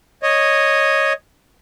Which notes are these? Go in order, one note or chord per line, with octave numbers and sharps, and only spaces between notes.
C#5 D#5